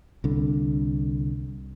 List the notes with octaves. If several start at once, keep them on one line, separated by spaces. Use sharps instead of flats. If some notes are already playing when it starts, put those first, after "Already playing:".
C2 D3